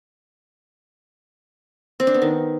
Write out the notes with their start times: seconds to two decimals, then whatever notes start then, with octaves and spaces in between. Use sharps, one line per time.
2.00 C4
2.07 D4
2.14 B3
2.22 D#3